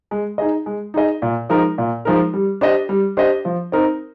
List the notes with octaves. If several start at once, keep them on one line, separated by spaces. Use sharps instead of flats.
G#3
D#4 G#4 D#5
G#3
D#4 G#4 D#5
A#2
F3 G#3 D#4 A#4
A#2
F3 G#3 D#4 A#4
G3
D4 G4 C5 D#5
G3
D4 G4 C5 D#5
F3
C4 D#4 A#4